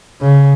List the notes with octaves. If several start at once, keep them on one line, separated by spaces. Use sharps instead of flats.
C#3